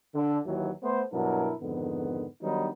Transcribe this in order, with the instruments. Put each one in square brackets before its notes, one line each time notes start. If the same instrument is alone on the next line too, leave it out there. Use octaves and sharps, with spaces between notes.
[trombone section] D3
D#2 E3 F#3
A3 B3 C5
G2 B2 F#3 D4 E4 A#4
F2 G#2 D3 D#3 B3
D#3 F#3 G3 B3 D4 D#4